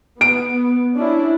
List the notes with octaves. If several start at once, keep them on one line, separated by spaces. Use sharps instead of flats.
B3 D7
C#4 D4 E4